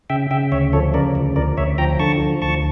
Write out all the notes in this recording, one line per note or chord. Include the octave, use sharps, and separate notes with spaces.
C#3 E5 G5
C#3 E5 G5
D2 C#5 E5
F3 A4 C#5
C#3 A#4 D5
D2
D2 A#4 D5
D2 C#5 E5
F3 G5 A#5
D3 A5 C#6
F3
D2 A5 C#6